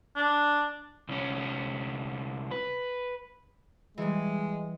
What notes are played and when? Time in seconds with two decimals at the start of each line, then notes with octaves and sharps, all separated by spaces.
0.16 D4
1.09 C2 C#4
2.51 B4
3.98 E3 G3 G#3